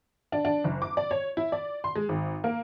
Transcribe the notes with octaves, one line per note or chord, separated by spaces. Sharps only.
D4
D4
F#1
D6
D5
C#5
E4
D5
C6
G#3
G#1
A#3